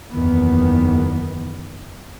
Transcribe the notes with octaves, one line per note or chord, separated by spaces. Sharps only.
F#1 E2 D#3 B3